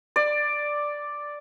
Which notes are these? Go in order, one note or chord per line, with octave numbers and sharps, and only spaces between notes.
D5